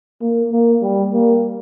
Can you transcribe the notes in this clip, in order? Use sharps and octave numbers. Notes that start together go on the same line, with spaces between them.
A#3
A#3
G3
A#3